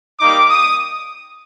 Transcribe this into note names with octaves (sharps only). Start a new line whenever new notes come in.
G3 A#3 D#4 D6
D#6